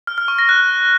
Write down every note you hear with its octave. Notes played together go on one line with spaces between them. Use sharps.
F6
F6
C#6
A#6
F#6